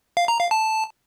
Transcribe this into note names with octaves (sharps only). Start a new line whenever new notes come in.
F5
A#5
F5
A5